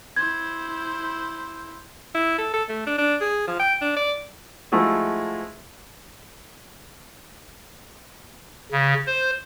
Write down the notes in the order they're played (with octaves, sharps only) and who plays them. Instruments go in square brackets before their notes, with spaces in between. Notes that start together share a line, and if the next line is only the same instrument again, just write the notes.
[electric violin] E4 C5 [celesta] G#6
[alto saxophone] E4
A4
A4
A3
D4
D4
G#4
F3
G5
D4
D5
[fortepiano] F3 G#3 A3 E4 F#4 G#4
[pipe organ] C#3
C5